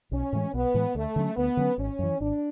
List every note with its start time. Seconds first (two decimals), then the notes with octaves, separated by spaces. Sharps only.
0.12 B1 C#4
0.33 A2 E3 G#3
0.53 B1 B3
0.74 A2 E3 G#3
0.95 D2 A3
1.16 D3 F#3 C#4
1.36 D2 B3
1.57 D3 F#3 C#4
1.78 G#1 C#4
1.99 F#2 E3
2.20 G#1 D4